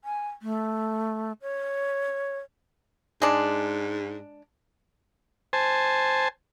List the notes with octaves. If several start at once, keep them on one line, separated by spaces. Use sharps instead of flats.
G#5
A3
C#5
G#2 G#3 D4
C5 G#5 A5